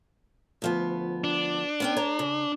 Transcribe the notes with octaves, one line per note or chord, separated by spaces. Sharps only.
D2 F3 B3
D4
B3 C#4 G5
C#5 A#5
C#3